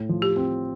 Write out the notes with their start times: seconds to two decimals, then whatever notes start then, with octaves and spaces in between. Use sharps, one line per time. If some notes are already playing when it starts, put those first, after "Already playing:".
Already playing: A2
0.09 F3
0.22 G4
0.36 C4